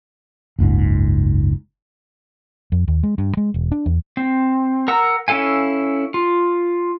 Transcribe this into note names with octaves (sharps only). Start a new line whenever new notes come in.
F#1 C#2 G#2
F2
D#2
G#3
G2
G#3
E1
D4
E2
C4
A#4 F#5 A#5 E6
C#4 E4 A4 F5 G#5
F4